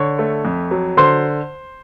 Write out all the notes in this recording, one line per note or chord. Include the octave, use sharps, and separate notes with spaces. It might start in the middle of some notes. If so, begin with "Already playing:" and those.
Already playing: D3 C#5 C#6
A3
F2
F#3
D3 C5 C6